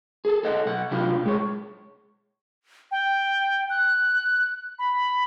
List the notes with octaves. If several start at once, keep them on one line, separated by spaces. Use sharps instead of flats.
G#4 A4
A4 D#5 F#5
B1 F#5
C3 F#3 D4 E4 F4 G4
A#2 G#3 C#5
G5
F#6
B5